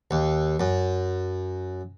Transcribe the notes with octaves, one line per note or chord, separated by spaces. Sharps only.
D#2
F#2